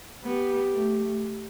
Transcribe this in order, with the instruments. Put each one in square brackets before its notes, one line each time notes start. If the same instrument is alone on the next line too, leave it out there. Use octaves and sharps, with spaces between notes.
[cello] B3 [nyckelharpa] G4
[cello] A3